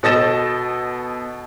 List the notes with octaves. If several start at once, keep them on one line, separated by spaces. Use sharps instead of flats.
B2 A4 D#5 A6 A#6 E7